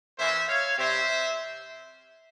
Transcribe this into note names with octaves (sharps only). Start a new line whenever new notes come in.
E3 A#3 C#4 C5 E5
C#5 F5
C3 G3 C4 C5 E5